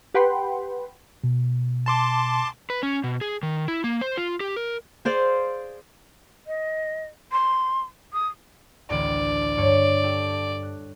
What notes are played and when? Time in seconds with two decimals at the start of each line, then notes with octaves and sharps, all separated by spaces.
0.14 G4 B4 F#5 G5 B5 C6
1.24 B2
1.86 A5 C6 D6
2.70 B4
2.83 C#4
3.04 B2
3.21 G#4
3.43 D#3
3.68 E4
3.84 A#3
4.01 C5
4.17 F4
4.40 G4
4.56 A#4
5.05 G#4 C5 D5 F5
6.47 D#5
7.32 C6
8.13 D#6
8.90 A1 D2 D5
9.58 G2 C#5 C#6
10.04 G4 A4
10.63 F#6